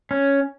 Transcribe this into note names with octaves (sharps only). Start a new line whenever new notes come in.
C#4